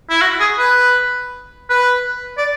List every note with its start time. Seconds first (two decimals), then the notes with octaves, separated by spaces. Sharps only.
0.10 E4
0.22 F#4
0.40 G#4
0.59 B4
1.70 B4
2.38 D5